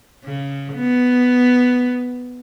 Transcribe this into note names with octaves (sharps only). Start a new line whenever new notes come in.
C#3
B3